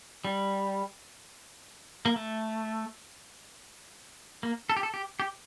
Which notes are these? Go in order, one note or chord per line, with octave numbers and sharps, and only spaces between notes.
G3
A#3
A3
A#3
A4
G4
A4
G4
G4